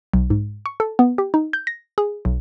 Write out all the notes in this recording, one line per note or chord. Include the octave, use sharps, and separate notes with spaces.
B1
G#2
C#6
A4
B3
G4
D#4
G6
A#6
G#4
B1